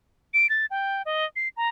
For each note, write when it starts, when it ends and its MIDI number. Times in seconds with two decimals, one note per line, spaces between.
0.34 0.49 98
0.49 0.66 93
0.71 1.02 79
1.06 1.25 75
1.36 1.48 96
1.57 1.69 82